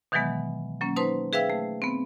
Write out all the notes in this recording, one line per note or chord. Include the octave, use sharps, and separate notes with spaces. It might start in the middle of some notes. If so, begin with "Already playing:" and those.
B2 D#3 E3 F#3 G#3 B3
F#3 A#3 C#4
D#4 B4 C5 A5 C6
G#4 B4 E5 F5 G5 E6
A3
B3 C4